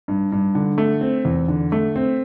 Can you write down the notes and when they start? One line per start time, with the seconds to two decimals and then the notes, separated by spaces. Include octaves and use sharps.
0.08 G2
0.32 G2
0.55 D3
0.78 A3
1.01 C4
1.25 E2
1.48 D3
1.72 A3
1.96 C4